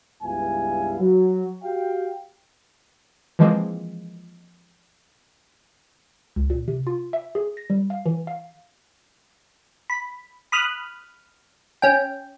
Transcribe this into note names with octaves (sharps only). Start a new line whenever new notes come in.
C#2 G2 B3 E4 F5 G#5
F#3
F#4 G4 F5 G5
E3 F3 G#3 A#3 C4
C#2
A#2
C3
F4
E5
G#4
A#6
G3
F5
E3
F5
B5
B5 D#6 F6 F#6
C#4 G5